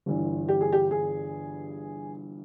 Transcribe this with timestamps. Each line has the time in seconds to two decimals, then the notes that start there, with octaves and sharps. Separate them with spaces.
0.06 G1 G2 E3
0.49 G4
0.61 G#4
0.73 G4
0.91 G#4